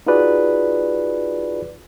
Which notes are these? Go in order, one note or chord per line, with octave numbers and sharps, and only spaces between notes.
D#4 F4 F#4 G#4 B4 D5